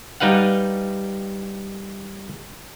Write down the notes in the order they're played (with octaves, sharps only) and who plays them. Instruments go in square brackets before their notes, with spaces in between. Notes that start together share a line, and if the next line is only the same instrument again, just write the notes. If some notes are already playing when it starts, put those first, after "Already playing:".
[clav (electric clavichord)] G3 D#4 B4 F5 F#5